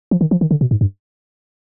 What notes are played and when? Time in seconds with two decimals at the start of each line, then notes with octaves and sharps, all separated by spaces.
0.11 F3
0.21 D#3
0.31 F3
0.41 D#3
0.51 D3
0.61 B2
0.71 G#2
0.81 G2